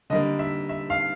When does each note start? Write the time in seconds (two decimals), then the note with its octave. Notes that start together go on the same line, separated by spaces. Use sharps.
0.10 D3 G3 A#3 D#5
0.39 E5
0.69 E5
0.90 F5